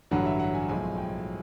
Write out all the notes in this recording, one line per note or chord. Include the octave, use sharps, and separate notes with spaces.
A1 G2 D3 F#3 F#5
E5
F#5
G#5
B1 A2 F3 G#3 G#5
G5